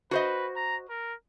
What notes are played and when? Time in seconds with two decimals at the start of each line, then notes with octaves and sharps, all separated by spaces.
0.11 F#4 B4 C5 D#5
0.56 A#5
0.89 A#4